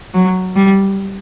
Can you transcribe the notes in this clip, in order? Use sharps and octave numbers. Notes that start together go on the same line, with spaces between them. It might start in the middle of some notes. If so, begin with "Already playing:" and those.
F#3
G3